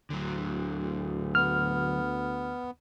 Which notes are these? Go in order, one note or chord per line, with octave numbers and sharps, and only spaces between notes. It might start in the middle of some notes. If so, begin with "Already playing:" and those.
D2 D3 F#3
B3 F6